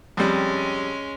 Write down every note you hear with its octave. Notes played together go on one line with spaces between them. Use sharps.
F2 G3 G#3 C#4